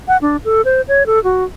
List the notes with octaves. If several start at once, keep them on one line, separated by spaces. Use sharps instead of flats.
F#5
D4
A4
C5
C#5
A4
F#4